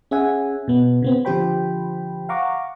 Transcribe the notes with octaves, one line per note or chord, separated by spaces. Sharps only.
C#4 G#4 E5 F#5 G#5
B2 B3
C#3 B3 C4
D3 F3 G4 C5 G5 B5
F5 F#5 A#5 C#6 D6